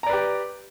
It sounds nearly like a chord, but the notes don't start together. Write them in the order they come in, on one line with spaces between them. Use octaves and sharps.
A#5 D5 B4 G4